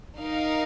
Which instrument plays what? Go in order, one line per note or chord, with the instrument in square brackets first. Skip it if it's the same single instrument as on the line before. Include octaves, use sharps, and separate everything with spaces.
[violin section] D#4 A#4 F5